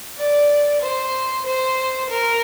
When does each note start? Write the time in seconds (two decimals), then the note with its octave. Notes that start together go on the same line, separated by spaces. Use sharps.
0.18 D5
0.81 C5
1.46 C5
2.10 A#4